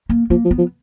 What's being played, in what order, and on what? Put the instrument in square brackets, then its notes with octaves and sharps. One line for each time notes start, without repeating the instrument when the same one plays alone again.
[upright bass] A#3
[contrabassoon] F3 [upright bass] A#3
[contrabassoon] F3
[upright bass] B3
[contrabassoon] F3